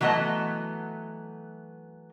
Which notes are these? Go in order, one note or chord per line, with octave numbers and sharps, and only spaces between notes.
E3 F#3 A3 B3 D#5 A5